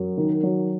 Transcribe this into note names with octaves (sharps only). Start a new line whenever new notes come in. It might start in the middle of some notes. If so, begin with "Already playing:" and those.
Already playing: F#2 F#3
D#3
F#3